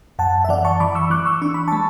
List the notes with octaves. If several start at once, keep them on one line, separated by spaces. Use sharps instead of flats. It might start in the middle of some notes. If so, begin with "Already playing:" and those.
F#2 F#5 A5
E5
E3 D5 F#5
A5 C#6
E3 B5 D6
C#6 E6
E3 D6 F#6
C#6 E6
D4 C#6
B5
G#3 A5 C#6